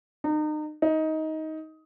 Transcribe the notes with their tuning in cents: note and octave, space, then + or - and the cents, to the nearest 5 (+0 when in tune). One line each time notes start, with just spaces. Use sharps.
D#4 -35
D#4 +15